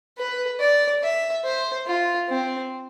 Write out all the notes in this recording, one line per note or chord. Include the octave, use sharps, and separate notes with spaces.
B4
D5
E5
C5
F4
C4